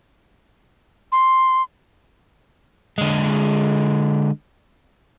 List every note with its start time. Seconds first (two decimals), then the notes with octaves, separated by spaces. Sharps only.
1.12 C6
2.98 D3 G#3